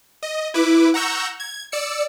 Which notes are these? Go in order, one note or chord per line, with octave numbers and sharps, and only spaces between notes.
D#5
E4 B4 D6
F#5 A#5 C#6 E6 G6
G#6
D5 E6 C#7